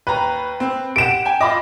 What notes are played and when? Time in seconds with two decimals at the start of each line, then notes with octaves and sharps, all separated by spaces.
0.07 D#2 B4 A#5
0.60 C4
0.96 G4 F#5 D7 E7
1.25 G5 G#5
1.41 F4 D#5 B5 D6